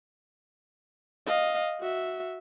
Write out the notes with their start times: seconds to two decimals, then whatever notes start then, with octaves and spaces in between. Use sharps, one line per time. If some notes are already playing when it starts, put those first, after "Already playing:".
1.27 D#5 F5
1.81 F#4 E5